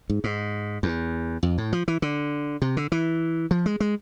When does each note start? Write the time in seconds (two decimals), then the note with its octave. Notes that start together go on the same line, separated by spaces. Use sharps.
0.10 G#2
0.24 G#2
0.83 E2
1.43 F2
1.58 A2
1.73 F3
1.88 E3
2.02 D3
2.62 C3
2.77 D3
2.92 E3
3.51 F3
3.66 G#3
3.80 G#3